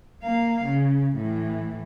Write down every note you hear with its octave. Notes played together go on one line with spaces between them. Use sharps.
A#3 F5
C#3
A2 E3